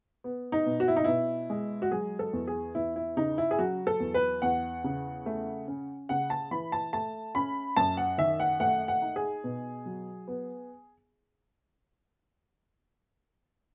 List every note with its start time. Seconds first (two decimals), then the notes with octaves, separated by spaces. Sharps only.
0.24 B3
0.52 D#4
0.66 B2
0.80 F#4
0.88 E4
0.96 D#4
1.04 B2 E4
1.50 G#3
1.82 F#4
1.91 F#3 G#4
2.19 A4
2.33 E2
2.47 G#4
2.75 E2 E4
2.96 E4
3.17 C#3 D#4
3.38 E4
3.51 G#4
3.59 F#3 F#4
3.87 A4
4.00 E2
4.14 B4
4.42 E2 F#5
4.84 C#3
5.26 A3
5.68 C#4
6.09 C#3 F#5
6.30 A5
6.51 E3 B5
6.72 A5
6.93 A3 A5
7.35 C#4 B5
7.76 F#2 A5
7.97 F#5
8.18 D#3 E5
8.40 F#5
8.60 A3 F#5
8.88 F#5
9.02 D#4
9.16 G#4
9.44 B2
9.86 F#3
10.28 B3